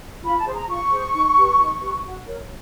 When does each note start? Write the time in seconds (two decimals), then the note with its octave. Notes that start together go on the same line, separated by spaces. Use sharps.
0.23 F4 B5
0.38 A5
0.46 G#4 C5
0.53 A#5
0.68 F4 C#6
0.91 G#4 C5
1.14 D#4
1.37 G4 B4
1.60 D#4
1.81 G4 B4
2.04 F#4
2.27 A#4 C#5